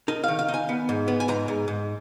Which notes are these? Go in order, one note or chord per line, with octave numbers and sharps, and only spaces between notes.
D#4 A#4
D#3 F5
F5
D#4
G#5
B3
G#2
B3
G#5
G#2 A#5
G#2
G#2